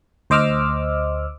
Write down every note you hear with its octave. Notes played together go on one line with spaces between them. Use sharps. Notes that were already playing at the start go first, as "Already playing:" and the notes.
D2 C5 D#5 D6 E6 F6